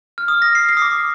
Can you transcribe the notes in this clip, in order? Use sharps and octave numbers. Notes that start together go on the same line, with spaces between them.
F6
D#6
A#6
C7
C7
D#6
D6